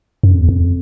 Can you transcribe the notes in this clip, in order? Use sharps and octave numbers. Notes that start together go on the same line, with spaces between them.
F#2
F2
E2
F2